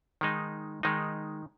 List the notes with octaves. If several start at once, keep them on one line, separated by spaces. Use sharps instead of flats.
D#3 G#3 D#4
D#3 G#3 D#4